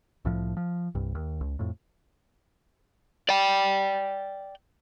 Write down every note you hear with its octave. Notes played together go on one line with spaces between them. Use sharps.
C2 A2 F3
F3
C2 G2
D#2
C#2
F2 A2
D5 G5